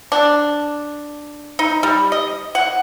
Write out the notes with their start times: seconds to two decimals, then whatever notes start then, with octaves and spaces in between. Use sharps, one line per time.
0.12 D4
1.59 D#4
1.83 G3
2.12 D#5
2.55 F#5